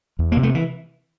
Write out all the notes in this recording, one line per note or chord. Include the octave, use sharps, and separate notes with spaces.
E2
C3 A#3
A3
E3